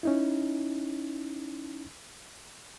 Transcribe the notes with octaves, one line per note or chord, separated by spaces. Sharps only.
C#4 D#4 E4